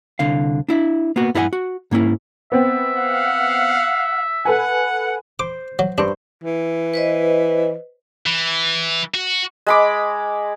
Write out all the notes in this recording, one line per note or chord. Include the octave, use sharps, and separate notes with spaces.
C2 D3 F5
D4 E4 E5
A#3 B3 F#4
G2 E4 A4 D5 F#5 G#5
F#4
G#2 A#3 C#4 E4
B3 C4 E5
F5 F#5
A4 B4 F#5 G#5
C5 D6
F#3
G2 D4 C5
E3
B4 C5 D#5
E3
F#4
G#3 B5 D6